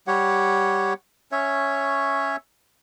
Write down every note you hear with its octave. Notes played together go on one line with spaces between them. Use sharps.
G3 G4 C#5 F#5
C#4 C#5 E5